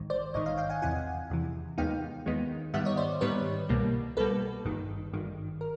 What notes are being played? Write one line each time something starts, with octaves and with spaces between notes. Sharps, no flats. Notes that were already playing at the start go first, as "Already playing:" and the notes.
Already playing: A1 G#2 D#3
C5 D5
A1 G#2 D#3 C#5 D#5
D#5 F5
F5 G5
F#5 G#5
E2 C3 E3 F#5 G#5
E2 C3 E3
D#2 D#3 G#3 B3 D#4 F5 G5
D#2 D#3 G#3 B3 D#4
G#2 D#3 G3 B3 E5 F#5
C#5 D#5
C5 D5
G#2 D#3 G3 B3 B4 C#5
C2 B2 G3 A#3
C2 B2 G3 A#3 A4 B4
G#1 G2 D#3
G#1 G2 D#3
A#4